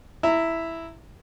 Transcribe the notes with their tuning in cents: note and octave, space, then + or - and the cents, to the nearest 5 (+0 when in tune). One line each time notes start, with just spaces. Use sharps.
E4 +0 E5 +0 A#5 -20